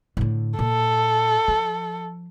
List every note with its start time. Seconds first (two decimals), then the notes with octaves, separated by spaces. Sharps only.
0.17 A2 D3
0.59 A#2 A4
1.48 F3